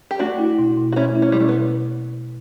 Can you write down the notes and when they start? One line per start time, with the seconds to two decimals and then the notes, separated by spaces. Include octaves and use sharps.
0.11 G4
0.19 A3 D4 F#4
0.39 E4
0.59 B2
0.77 B2
0.92 F#4
0.96 A3 C#4 E4
1.15 E4
1.22 C#4
1.32 B2 G3
1.40 A3
1.49 B3